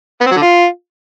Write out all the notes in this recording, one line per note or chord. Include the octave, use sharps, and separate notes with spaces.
B3
C4
F#3
D3
F4